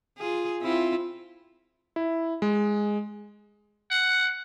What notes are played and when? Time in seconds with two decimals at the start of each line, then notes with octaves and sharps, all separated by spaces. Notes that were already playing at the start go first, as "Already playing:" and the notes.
0.18 F4 G#4
0.61 C4 E4 F4
1.96 E4
2.42 G#3
3.91 F#5